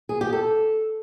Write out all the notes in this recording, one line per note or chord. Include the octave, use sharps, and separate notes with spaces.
G#4
G4
A4